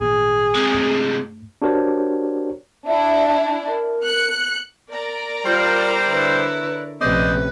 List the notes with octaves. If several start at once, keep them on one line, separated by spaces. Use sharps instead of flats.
G#1 A#2 G#4
C3 G#3
G2 A3
D4 F#4 G4 A#4 C5 C#5
D4 E4 E5
A#4
F#6 C#7
A#4 D5 A#5
G3 F4 C5
D3 E4 B4 C#5
A#1 A2 C3 C#4 B4 C5 D5 D#5